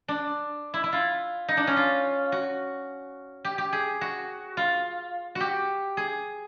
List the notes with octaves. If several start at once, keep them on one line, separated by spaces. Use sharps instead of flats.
D4
E4
E4
F4
D#4
D4
C#4
F4
F#4
G4
G4
G#4
F#4
F4
F#4
G4
G#4